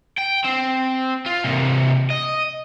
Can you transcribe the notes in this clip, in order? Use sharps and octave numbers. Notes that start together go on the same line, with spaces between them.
G5
C4
F4
C3 A#3
D#5